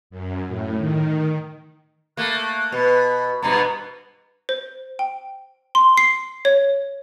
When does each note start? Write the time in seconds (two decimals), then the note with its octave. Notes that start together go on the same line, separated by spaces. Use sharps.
0.10 F#2
0.48 A2
0.78 D#3
2.17 A3 A#3 F#6
2.72 B2 B4
3.42 G2 B2 B3 A#5
4.49 C5
4.99 G5
5.75 C6
5.97 C7
6.45 C#5